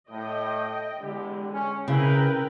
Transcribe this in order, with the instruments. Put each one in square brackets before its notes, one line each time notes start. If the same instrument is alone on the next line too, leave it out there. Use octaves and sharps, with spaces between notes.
[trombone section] A2 [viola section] D#5 G5
[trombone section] E2 E4 G4 [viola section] D3 G#3
[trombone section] C#4
[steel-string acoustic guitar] C#3 [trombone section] E4 [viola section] A#4 B4 G5